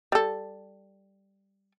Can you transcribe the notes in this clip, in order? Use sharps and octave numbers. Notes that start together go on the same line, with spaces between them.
G3 A4